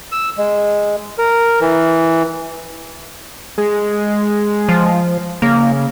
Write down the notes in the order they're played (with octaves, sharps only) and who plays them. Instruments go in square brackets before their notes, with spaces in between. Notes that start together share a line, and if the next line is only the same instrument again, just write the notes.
[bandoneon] E6
G#3
A#4
E3
[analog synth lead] G#3
[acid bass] F3
[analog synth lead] C#3 [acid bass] A#3